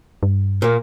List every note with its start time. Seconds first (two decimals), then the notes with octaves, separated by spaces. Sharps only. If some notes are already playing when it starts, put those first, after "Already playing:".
0.23 G2
0.62 A#2 A#3